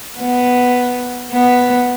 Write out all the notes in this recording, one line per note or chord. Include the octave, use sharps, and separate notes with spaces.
B3
B3